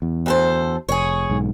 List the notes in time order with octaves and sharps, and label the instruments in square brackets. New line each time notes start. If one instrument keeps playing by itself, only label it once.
[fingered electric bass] E2
[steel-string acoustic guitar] D2 A4 C5
[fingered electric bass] F1 [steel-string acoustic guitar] G#4 C#5
[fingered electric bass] B1 G#2